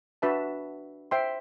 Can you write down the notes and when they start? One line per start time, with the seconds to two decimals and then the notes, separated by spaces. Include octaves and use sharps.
0.22 D4 F#4 B4 E5 A5
1.11 C5 E5 G5 C6